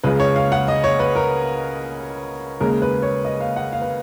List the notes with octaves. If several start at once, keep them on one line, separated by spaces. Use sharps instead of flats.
C#2 C#3 G#3 B4
C#5
F5
F#5
D#5
C#5
B4
A#4
D#2 C#3 G#3 A#4
B4
C#5
D#5
F5
F#5
F5
B4